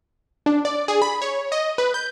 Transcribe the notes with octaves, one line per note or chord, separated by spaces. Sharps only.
D4
D5
G#4
B5
C#5
D#5
B4
G6